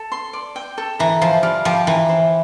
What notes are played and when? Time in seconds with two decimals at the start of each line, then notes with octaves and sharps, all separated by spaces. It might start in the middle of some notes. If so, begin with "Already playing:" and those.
Already playing: A4
0.12 C6
0.33 D5
0.56 G5
0.78 A4
0.99 E3 A#5
1.21 F3 C5
1.43 G3 F5
1.65 F3 G4
1.87 E3 A#5
2.09 C5